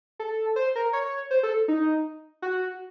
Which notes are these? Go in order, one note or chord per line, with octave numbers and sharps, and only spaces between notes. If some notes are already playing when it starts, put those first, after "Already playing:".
A4
C5
A#4
C#5
C5
A4
D#4
F#4